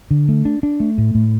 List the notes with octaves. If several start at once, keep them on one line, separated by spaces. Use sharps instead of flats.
D3
A3
D4
D4
A3
A2
A2